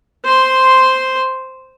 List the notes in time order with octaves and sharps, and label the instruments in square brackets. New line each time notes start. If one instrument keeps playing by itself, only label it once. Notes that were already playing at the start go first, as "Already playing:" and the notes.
[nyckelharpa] C5 C6